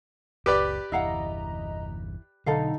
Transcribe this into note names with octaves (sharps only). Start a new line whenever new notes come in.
F#1 C#2 G4 B4 D5
G1 E2 E4 D#5 F5 F#5 A#5
B2 D3 F#3 D#4 A4 D#5 F5